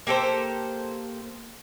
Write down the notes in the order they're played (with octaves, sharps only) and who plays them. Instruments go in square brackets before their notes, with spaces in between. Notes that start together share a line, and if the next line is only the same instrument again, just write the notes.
[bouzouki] A#3 G4 A4 C5